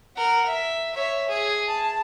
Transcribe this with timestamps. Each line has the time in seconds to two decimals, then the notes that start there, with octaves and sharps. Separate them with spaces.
0.17 A#4 F#5
0.47 E5
0.95 C#5 E5
1.29 G#4
1.68 A5